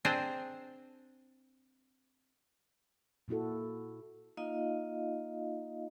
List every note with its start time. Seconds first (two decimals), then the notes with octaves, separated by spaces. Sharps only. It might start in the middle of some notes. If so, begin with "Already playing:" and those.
0.05 C4 D4 G#4 C5
3.28 A#2 A#3 E4 F#4 A4
4.37 A#3 D#4 F4 D#5 F5